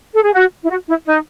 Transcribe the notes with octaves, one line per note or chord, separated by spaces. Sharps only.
A4
G#4
F#4
E4
F#4
E4
D#4